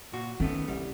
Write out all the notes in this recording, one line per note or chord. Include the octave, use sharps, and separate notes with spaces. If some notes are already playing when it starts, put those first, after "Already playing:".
A#2 F#4
D#3 A3 B3 C#4
C2 G3